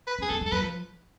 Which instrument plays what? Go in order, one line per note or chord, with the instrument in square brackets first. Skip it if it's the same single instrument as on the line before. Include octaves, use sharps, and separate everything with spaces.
[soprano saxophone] B4
[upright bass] C#4
[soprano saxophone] G#4
[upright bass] B3 [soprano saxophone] A4
[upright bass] G#3
[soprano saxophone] A4
[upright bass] F#3 [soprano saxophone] B4
[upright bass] F3